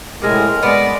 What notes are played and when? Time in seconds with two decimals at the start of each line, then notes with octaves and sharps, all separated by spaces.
0.22 A2 C3 G#3 G#4 A#4
0.63 G#3 B3 D5